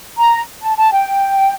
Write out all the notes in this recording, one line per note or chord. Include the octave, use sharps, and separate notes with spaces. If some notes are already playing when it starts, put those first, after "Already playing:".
A#5
A5
A5
G5